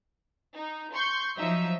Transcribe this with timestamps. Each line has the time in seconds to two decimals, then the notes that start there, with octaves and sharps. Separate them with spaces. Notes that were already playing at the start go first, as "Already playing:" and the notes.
0.54 D#4
0.93 C6 C#6 G6
1.37 F3 F#3 D#4 E5